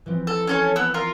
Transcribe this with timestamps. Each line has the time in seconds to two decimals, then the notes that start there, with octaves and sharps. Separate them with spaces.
0.06 E3 F3 C4
0.27 A4
0.47 C#4 A4 C#5
0.76 B3 E6
0.94 F4 A#4